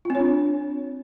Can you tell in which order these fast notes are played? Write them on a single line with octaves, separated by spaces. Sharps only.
F4 C4 C#5 D4